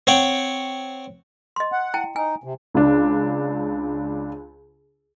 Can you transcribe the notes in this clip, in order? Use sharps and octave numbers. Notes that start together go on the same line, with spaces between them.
C4 C#5 F#5 G5
D#5 C6
F#5
E4 G5 A5
D#4 G#5
C3
C#2 D4